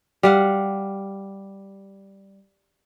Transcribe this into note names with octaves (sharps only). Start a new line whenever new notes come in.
G3 F5 F#5